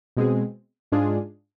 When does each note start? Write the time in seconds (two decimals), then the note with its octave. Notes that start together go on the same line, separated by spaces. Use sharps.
0.17 B2 G#3 C4 G#4
0.92 G#2 G#3 D4 F4 G#4